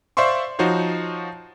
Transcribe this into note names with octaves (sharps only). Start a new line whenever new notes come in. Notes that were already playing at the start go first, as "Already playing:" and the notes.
C5 D5 E5 F5 C6 C#6
F3 D#4 F#4 C5 C#5